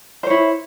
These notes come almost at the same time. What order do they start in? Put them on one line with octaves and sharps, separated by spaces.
C5 C#5 E4